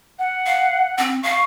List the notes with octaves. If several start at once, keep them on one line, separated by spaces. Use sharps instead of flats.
F#5
F5
C4
F5 C#6